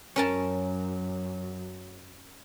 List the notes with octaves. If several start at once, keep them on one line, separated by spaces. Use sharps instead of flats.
F#2 F#3 C#4 A#4 A5